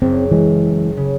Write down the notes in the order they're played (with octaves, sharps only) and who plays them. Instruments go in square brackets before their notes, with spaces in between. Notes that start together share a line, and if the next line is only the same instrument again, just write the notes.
[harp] F#1 [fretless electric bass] C4
[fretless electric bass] E3 G#3
[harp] C#3